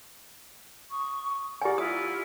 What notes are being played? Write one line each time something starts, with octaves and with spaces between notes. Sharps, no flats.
C#6 D#6
G4 A#4 D5 F#5 G#5
E4 F4 D#6